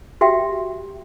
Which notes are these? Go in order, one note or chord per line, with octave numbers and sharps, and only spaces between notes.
F#4 G4 E5 G5